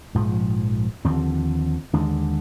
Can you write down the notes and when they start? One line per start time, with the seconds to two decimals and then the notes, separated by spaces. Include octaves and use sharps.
0.15 A#1 G#2 F3
1.05 D#2 D3 F3 C4
1.93 D#2 D3 G#3 D4